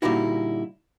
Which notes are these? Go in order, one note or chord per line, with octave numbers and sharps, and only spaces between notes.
A#2 D3 G3 D#4 E4 F#4